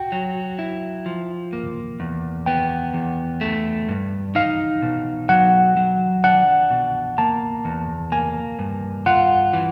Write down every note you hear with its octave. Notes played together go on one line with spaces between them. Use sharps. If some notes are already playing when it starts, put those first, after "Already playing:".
Already playing: F#4 G5
F#3
E4
F3
A#3
E2
B3 G5
E2
A3
G2
D#4 F5
B2
F#3 F#5
F#3
D4 F#5
B2
A#3 A5
E2
A#3 G#5
G2
F4 F#5
E3